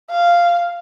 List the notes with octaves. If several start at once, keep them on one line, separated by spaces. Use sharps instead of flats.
F5